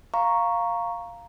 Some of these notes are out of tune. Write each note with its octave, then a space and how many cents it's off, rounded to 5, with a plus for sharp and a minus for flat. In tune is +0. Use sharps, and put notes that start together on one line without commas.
F5 +0 A#5 +0 C#6 +0